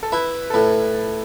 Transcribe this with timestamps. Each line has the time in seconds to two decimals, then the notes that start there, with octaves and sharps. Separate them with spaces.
0.03 A4
0.12 E4 B4
0.50 A4
0.54 A2 B4